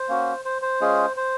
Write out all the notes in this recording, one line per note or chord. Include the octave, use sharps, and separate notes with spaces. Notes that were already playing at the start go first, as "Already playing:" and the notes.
Already playing: C5
A#3 C#4 F#4
C5
C5
G#3 C#4 F4 G#4
C5